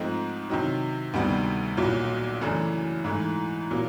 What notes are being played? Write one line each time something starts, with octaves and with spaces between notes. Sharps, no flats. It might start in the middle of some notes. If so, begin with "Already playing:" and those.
Already playing: G#2 F3 A3 C4 D#4
C3 D#3 F#3
D2 C3 D#3 G3 B3
B1 A#2 F#3
F#2 C#3 E3 A3 D4
G#2 E3 A3
A#2 F#3 A#3